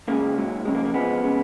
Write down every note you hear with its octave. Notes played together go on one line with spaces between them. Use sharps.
F#2 C#3 G#3 A#3
G#2 F#3
F2 C#3 G#3
A#3
A#3
F2 F3 G#3 B3
C#3 G#3